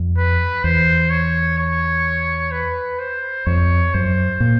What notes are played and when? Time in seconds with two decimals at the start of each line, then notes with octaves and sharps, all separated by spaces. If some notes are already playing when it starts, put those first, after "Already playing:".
Already playing: F2
0.17 B4
0.64 E2 C5
1.11 C#5
1.58 C#5
2.52 B4
3.00 C5
3.47 F2 C#5
3.94 F#2 C5
4.40 A#2